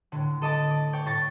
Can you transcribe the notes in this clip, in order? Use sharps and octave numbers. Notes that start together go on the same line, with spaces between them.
A2 D3
A4 D#5 A5 D6
D5
C#5 D5 G5
A2 C#6 A6 A#6 C#7